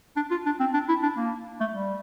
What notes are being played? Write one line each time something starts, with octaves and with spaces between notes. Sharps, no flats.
D4
F4
D4
C4
D4
E4
D4
A#3
A3
G3